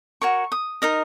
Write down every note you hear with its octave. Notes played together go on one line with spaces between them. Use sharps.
F#4 A#4 C#5 C#6
D#6
D#4 A#4 D#5